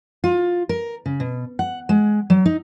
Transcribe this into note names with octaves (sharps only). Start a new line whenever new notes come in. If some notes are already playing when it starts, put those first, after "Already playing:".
F4
A#4
C#3
B2
F#5
G#3
F#3
D#4